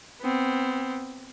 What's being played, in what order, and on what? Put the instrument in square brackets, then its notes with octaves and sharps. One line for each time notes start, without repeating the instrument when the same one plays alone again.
[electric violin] B3 C4